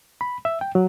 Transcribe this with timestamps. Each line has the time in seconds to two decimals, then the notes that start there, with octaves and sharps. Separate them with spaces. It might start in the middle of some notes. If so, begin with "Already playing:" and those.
0.21 B5
0.45 E5
0.61 G5
0.75 F#3